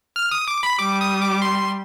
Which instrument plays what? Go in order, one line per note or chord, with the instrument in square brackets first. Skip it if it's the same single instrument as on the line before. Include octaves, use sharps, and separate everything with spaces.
[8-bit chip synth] F6
D#6
D6
B5
[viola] G3 [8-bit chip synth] D6
[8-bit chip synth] D#6
D6
C6